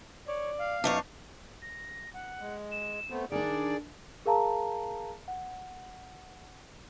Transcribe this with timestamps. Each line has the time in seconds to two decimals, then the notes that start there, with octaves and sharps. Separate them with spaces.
0.28 C#5 D5
0.59 F5
0.84 F#2 B3 D4 D#4 C#5
1.62 A#6
2.14 F#5
2.40 G#3
2.71 E7
3.10 A3 B3 C4
3.32 D#3 D4 G#4 D5 D7
4.26 G#4 A#4 F5 A5 A#5
5.28 F#5